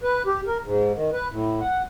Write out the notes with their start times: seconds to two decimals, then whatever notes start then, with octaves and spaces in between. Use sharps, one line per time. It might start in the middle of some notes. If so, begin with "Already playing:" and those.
0.03 B4
0.26 G4
0.47 A#4
0.64 G#2
0.94 D#3
1.13 B4
1.32 A2
1.60 F#5